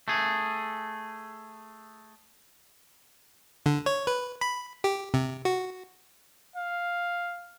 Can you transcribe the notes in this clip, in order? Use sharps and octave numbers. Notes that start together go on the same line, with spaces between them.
A3 G#4
D3
C#5
B4
B5
G4
C3
F#4
F5